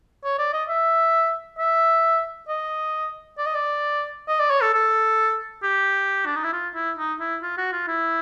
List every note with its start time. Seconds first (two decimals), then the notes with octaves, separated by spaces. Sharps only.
0.24 C#5
0.39 D5
0.53 D#5
0.69 E5
1.59 E5
2.48 D#5
3.38 D5
3.46 D#5
3.55 D5
4.28 D#5
4.40 D5
4.50 C#5
4.61 A4
4.74 A4
5.63 G4
6.26 D4
6.36 D#4
6.44 E4
6.53 F4
6.75 E4
6.98 D#4
7.20 E4
7.43 F4
7.57 F#4
7.72 F4
7.88 E4